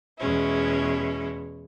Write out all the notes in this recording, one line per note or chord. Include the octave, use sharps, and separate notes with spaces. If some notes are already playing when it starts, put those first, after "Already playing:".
E2 B2 G#3 C#4 E4